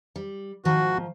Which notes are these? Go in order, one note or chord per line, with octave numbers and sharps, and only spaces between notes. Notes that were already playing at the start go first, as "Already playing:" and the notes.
G3
G#2 D#3 F3 F#4